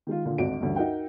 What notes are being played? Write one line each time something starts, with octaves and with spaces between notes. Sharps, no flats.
D#3 G#3 F4
A#2 D3 A#3 F4
G#1 D2 F#4 D#5 D7
A1 D2 G2
D#4 F#4 A#4 E5 F#5 G5